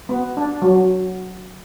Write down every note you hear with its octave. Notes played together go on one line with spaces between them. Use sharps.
B3
D4
F#3